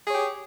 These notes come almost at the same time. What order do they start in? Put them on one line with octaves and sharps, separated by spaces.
G#4 C#5 G4